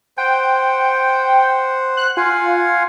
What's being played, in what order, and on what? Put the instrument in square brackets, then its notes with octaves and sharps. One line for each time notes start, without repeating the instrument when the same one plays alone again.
[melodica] C5 F#5 [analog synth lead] G5
[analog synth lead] F#6
[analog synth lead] F4 [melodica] F5 F#5 G#5